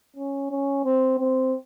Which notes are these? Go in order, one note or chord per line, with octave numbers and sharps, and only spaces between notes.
C#4
C#4
C4
C4